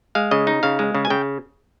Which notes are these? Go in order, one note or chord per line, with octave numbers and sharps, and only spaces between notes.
G#3 F5
C#3 D#5
D#4
C#3 F5
G#3
C#3
G#5
C#3 G5